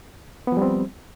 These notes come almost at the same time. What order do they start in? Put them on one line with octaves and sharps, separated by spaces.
B3 F3 G3 C4